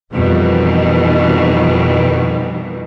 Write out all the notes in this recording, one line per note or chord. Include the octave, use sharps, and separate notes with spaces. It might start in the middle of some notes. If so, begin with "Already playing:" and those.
F2 B2 D#3 E3 G3